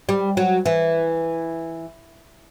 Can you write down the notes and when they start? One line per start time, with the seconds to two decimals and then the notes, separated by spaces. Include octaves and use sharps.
0.09 G3
0.37 F#3
0.66 E3